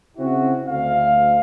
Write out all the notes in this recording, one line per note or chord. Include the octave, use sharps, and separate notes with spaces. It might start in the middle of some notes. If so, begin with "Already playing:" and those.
C#3 C4 E4 F#4
D2 F5